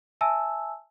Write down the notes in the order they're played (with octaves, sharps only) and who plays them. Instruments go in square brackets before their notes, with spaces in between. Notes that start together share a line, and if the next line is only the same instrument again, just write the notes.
[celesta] E5 G#5 A5 E6